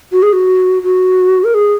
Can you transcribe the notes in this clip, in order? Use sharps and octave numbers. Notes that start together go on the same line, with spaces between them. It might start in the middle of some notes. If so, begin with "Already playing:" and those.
F#4
G#4
F#4
F#4
A#4
G#4